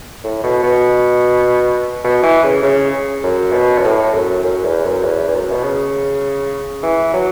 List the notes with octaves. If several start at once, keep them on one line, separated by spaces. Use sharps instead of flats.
A2
B2
B2
B2
E3
C#3
C#3
F#2
B2
F#2
A2
F#2
F#2
E2
F#2
E2
E2
F#2
B2
C#3
E3
F#3